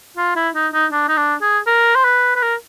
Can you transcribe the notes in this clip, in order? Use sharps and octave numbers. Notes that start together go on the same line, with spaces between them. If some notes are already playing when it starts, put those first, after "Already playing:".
F4
E4
D#4
D#4
D4
D#4
D4
G#4
A#4
C5
B4
B4
A#4